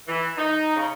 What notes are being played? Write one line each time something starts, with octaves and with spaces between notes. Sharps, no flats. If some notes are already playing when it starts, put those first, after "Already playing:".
E3
D#4
C#3